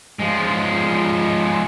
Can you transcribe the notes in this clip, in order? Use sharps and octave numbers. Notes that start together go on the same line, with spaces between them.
F3 G#3